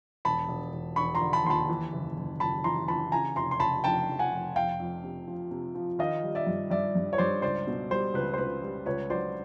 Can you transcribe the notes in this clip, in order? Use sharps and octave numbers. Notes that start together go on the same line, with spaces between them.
E1 A5 B5
E1
E1
E1 B5 C#6
A#5 C6
D3
A5 B5
D#2 C6
A5 B5
E3
F#1
F#1
F#1 A5 B5
E3 A#5 C6
E3 A5 B5
C#3 G#5 A#5
F1 A#5 C6
C6
C#3 A5 B5
F1 G5 A5
F1
F#5 G#5
F1
F2 F5 G5
F2
C3
F3
C3
F3
D#3 D#5 F5
G3
D5 E5
G2
G2 D5 E5
G2
C#5
G2 C5 D5
C#2 C5 D5
B2
G3 C5
C#2 B4
C5
C#2 B4
G3
C#2 B4 C#5
F#3 C5 D5